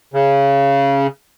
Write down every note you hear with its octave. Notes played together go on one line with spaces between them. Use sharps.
C#3